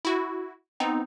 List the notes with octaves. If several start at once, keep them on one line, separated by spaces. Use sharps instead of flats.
E4 F#4
B3 C4 D#4